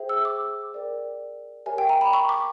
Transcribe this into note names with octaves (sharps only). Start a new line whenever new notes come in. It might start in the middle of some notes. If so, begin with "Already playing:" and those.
Already playing: G#4 C5 E5 G5
E6
D6
A#4 D5 G5
G4 A#4 C#5 E5 G#5
G5
A#5
B5
C#6
D6